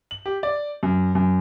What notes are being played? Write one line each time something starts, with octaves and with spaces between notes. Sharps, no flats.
F#7
G4
D5
F#2
F#2